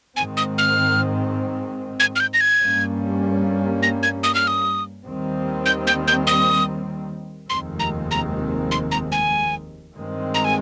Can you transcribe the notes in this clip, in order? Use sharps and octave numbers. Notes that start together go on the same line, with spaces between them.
G#2 D#3 G#3 C4 G#5
D#6
F6
G#6
F6
G6
A#6
G#6
G2 G3 A#3 C#4
A#6
G#6
D#6
F6
D#6
D#2 D#3 G3 C4
G6
G6
G6
D#6
F1 D#2 D#3 G#3 C4 C6
A#5
A#5
C6
A#5
G#5
G2 D#3 G#3 C4
A#5
G#5